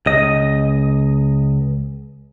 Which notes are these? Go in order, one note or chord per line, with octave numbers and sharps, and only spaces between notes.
C#2 D#5